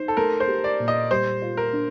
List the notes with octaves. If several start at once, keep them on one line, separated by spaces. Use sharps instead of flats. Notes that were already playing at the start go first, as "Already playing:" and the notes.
Already playing: D#4 C5
A4
A3 A#4
C5
G4
D5
A#2
D#5
G3 C5
F4
A#4
D4